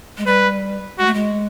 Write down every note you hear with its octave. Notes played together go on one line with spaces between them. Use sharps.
G#3
G3 B4
G#3 F#4
A3
G#3